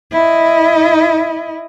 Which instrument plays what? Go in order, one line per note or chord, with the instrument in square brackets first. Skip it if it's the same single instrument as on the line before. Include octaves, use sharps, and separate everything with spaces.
[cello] E4 D#5